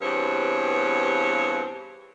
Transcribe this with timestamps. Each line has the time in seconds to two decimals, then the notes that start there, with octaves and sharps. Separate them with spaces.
0.01 E2 G2 B2 C4 C#5